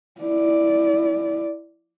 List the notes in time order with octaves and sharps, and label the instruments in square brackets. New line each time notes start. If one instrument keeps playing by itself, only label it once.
[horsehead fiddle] E4 D5